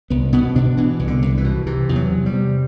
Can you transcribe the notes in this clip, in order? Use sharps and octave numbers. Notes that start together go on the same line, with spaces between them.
C2 B3
B2 B3
B2 D4
B2 E3
C2
D3
C2
E3
B2
C3 E3
E2
F#3
C3
G3
C3